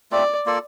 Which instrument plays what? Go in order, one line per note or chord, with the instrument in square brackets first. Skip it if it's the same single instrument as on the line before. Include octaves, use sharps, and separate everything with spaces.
[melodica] A3 C4 F4 [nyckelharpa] D5
[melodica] A#3 F4 A4 D5